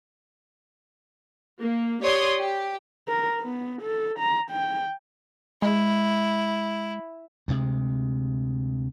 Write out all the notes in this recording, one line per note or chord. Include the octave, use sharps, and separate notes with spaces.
A#3
G4 C#5 D5 C6 D#6
G4
A#4
B3
A4
A#5
G5
G#3 E4
D2 C3 G#3